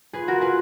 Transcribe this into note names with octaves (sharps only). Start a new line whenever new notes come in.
F4 G#4 B4
F#4 A#4
G#4 B4